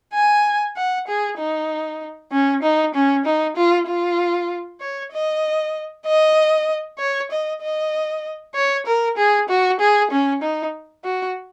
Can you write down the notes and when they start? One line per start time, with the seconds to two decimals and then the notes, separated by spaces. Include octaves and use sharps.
0.13 G#5
0.77 F#5
1.07 G#4
1.38 D#4
2.32 C#4
2.63 D#4
2.94 C#4
3.25 D#4
3.56 F4
3.87 F4
4.81 C#5
5.12 D#5
6.06 D#5
6.99 C#5
7.31 D#5
7.61 D#5
8.55 C#5
8.86 A#4
9.17 G#4
9.49 F#4
9.80 G#4
10.11 C#4
10.42 D#4
11.04 F#4